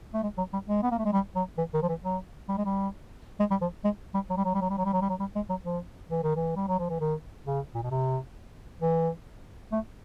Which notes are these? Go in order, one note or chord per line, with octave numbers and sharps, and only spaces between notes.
A3
G#3
F#3
G3
G#3
B3
A#3
A3
G#3
G3
F#3
E3
D#3
F3
E3
F#3
G3
G#3
G3
G#3
G3
F3
G#3
G3
F#3
G3
F#3
G3
F#3
G3
F#3
G3
F#3
G3
F#3
G3
G#3
F#3
F3
E3
D#3
E3
G3
F#3
F3
E3
D#3
C#3
A#2
B2
C3
E3
A3